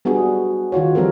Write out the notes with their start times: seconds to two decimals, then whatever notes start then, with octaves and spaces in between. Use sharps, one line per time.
0.05 G3 B3 D4 F#4 G#4
0.72 D#3 F4 F#4 C#5
0.95 F3 G3 C4 A4 A#4